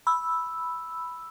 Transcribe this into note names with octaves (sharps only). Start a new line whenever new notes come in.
B5 E6